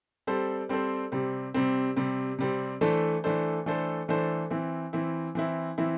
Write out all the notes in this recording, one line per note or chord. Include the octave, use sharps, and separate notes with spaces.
G3 C4 A4 C5
G3 C4 A4 C5
C3 G3 C4
C3 G3 C4
C3 G3 C4
C3 G3 C4
E3 A3 D4 A4 C5
E3 A3 D4 A4 C5
E3 A3 D4 A4 C5
E3 A3 D4 A4 C5
E3 C4 E4
E3 C4 E4
E3 C4 E4
E3 C4 E4